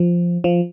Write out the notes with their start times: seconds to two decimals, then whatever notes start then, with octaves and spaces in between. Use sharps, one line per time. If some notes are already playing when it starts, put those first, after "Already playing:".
Already playing: F3
0.44 F3